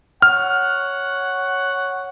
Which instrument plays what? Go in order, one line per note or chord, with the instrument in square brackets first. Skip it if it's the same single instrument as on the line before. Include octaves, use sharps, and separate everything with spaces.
[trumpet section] C#5 F#5 [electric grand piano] F6